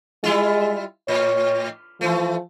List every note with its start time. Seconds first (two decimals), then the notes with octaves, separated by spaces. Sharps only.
0.24 G3 G#3 E4 F4
1.08 A2 C#5
2.01 E3 F3 A3